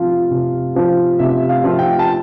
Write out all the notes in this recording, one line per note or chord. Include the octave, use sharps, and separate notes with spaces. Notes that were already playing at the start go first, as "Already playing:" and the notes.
Already playing: C3 F3 C4 F4
C3
F3 C4 F4
C3 E5
F5
F3 C4 F4
G5
A5